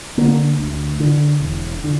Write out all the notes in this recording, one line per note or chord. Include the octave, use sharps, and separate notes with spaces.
D3 A#3
D2
D3
E1
D3